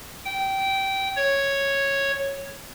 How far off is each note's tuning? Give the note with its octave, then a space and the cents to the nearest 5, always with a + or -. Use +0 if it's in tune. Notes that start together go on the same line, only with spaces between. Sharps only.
G5 -15
C#5 -5